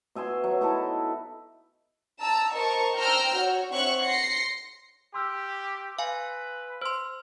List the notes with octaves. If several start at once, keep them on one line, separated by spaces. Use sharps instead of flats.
B2 E5 G#5 C6
F#3
D#4 E4 A4 B4
A5 A#5 E6
A#4 C5 D#5 A5 C#6
C5 G5 A#5 E6 F6 G6
F#4 C#5
C4 C#5 E5 F#5 C#6 F#6
C6 A#6 C7 C#7
G4 C6 E6 F6
B4 F5 G#5
C5 C6 E6 F6